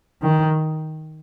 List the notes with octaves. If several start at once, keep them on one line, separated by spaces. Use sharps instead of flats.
D#3